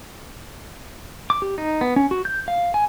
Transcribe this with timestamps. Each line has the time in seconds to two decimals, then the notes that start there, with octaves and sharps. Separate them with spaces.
1.30 D6
1.42 G4
1.58 D#4
1.81 B3
1.96 C#4
2.11 F#4
2.25 G6
2.48 F5
2.74 G#5